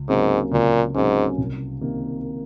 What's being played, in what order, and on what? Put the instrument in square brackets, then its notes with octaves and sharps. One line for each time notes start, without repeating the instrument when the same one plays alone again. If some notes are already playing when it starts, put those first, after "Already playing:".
Already playing: [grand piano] C#2
[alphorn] G#2 [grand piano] C3 F#3 A#3 C#4
[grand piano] C#2 [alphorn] A#2
[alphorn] G#2 [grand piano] C3 F#3 A#3 C#4
[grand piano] C2
C3 D#3 A#3 D#4